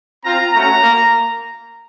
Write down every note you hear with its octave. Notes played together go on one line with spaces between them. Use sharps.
C4 F4 A#5
A3 C#4 F#4 A#5
A#3